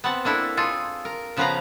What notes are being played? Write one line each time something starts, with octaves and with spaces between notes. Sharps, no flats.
B3 C4 F#5 A5
A#3 D4 E4 A4
F4 G#4 A4
A#4
C#3 F3 B3 B4 F5 A#5